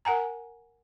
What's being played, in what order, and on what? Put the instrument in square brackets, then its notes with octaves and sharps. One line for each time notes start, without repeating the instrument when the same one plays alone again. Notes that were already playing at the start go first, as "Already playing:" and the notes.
[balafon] A#4 F#5 G#5 A#5